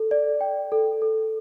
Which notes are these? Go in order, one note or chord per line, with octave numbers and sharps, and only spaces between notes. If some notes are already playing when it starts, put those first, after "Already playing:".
Already playing: A4
D5
G5
A4
A4